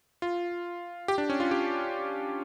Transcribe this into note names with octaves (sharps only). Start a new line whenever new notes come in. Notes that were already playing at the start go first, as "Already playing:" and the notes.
F4
G4
D4
C#4
F4
G4